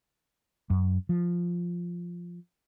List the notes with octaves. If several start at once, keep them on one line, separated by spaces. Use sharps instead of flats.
F#2
F3